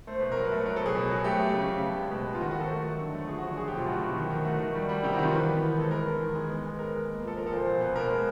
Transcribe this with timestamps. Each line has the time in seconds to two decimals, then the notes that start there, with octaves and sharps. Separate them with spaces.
0.07 A3 C5
0.19 B2 B4
0.32 A#4
0.37 F#3
0.44 B4
0.52 A3
0.66 F#3 A#4
0.76 A4
0.80 B2
0.86 G#4
0.95 B2
1.10 F#3
1.24 A3 G4
1.39 A3
1.54 C#3
1.69 C#3
1.83 B3
1.97 G#3
2.11 B2
2.26 B3
2.35 F4
2.41 D#3 F#4
2.51 F#4
2.55 D#3
2.60 A4
2.71 A3
2.85 F#3
2.99 D3
3.14 A3
3.28 F3 G#4
3.38 F#4
3.43 D3
3.57 F#3 G#4
3.67 G4
3.73 B2 F4
3.86 A3 F#4
4.01 B2
4.16 D#3
4.31 D#3
4.45 A3 F#4
4.59 D#3
4.75 G3
4.89 G3
5.03 C3 G4
5.13 F#4
5.19 D#3 F4
5.33 E3 B4
5.47 B3
5.62 E3
5.77 G#3 A4
5.91 G#3 A#4
6.06 B3
6.20 D#3
6.35 G#3
6.49 B3
6.64 G#3
6.78 G#3 A#4
6.93 G#3
7.08 A#3
7.22 F3
7.27 A4
7.37 F3 A#4
7.46 A4
7.52 A#2 C5
7.66 B2 C5
7.81 B3
7.95 B2 A#4
8.10 G#3